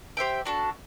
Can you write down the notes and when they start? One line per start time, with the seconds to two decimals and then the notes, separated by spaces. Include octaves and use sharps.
0.17 G4 C5 E5 G5
0.45 D4 F#4 A4